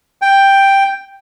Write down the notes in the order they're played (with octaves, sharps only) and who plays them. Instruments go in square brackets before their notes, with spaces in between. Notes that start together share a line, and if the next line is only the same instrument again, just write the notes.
[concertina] G5